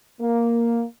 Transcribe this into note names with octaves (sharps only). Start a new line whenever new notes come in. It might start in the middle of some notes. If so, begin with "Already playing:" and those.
A#3